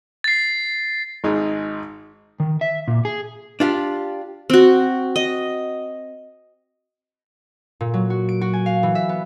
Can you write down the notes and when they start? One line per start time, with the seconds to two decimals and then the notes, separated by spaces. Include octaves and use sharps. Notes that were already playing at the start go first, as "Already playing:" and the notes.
0.24 A6 C7
1.24 G#1 G#3 D#4
2.40 D#3
2.61 E5
2.88 A#2
3.05 G#4
3.60 D4 F4 G4
4.50 C4 F#4
5.16 D#5
7.81 A#2
7.94 F#3
8.10 F#4
8.29 D7
8.41 F#4
8.53 G#5
8.66 F5
8.83 E3
8.95 E5
9.09 B3